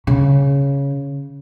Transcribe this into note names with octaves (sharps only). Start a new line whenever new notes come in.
C#3